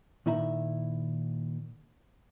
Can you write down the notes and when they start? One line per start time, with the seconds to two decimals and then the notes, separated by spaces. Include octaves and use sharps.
0.26 A#2 D#3 E4 E5 A#5